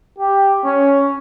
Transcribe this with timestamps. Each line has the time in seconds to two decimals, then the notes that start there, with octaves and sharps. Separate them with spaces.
0.19 G4
0.65 C#4